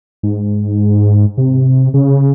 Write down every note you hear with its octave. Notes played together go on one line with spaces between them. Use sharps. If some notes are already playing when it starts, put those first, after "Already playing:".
G#2
C3
C#3